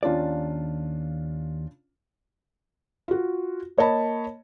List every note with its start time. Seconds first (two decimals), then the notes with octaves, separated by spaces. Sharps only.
0.03 D#2 C#4 D4 F4 D5
3.08 F4 F#4
3.78 A#3 C#5 D#5 A5 B5